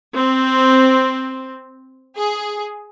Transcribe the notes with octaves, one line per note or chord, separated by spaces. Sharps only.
C4
G#4